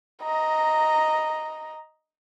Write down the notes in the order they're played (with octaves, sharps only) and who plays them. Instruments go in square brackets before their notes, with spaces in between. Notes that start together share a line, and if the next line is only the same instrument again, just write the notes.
[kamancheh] D#5 A#5